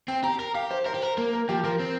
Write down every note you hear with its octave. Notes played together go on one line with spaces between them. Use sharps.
C4 G5
G4 A#5
A#4 A#5
G4 F5
C5
A#4 C5
G4
A#4
A#3 A#4
A#4
F3 G4
F3 A#4
C4